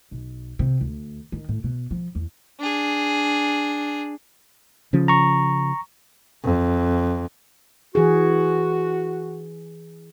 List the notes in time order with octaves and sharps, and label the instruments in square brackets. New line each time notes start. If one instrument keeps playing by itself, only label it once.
[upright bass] B1
C3
D2
D#3
A2
B2
F3
E2
[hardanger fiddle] D4 G#4
[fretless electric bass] C#3 F3 C#4
[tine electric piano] A#5 C#6
[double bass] F2
[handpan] E3 G#4 [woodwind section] F#4